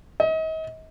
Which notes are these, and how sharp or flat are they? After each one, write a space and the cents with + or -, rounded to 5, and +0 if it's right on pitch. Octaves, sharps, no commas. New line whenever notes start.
D#5 +40